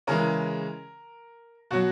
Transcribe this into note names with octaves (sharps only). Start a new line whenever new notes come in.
C#3 E3 G#3 A#4
B2 F#3 F#4